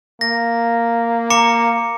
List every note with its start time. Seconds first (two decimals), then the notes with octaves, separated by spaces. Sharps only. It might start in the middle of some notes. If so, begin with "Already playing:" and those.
0.21 A#3 A#6
1.30 A#5 D6 C#7